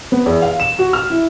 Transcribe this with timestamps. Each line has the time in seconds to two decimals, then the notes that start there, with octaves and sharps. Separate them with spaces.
0.12 B3
0.26 E2
0.42 F5
0.60 E7
0.79 F#4
0.93 F6
1.10 E4